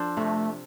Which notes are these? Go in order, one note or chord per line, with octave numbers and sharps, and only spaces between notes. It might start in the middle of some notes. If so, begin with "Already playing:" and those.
Already playing: F3 D4 A4 C5
C3 A3